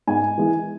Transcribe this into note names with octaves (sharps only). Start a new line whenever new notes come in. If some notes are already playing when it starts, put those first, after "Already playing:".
G#2 G#5
E3 G#3